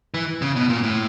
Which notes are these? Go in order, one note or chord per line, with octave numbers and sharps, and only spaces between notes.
E3
C#3
B2
A#2
A2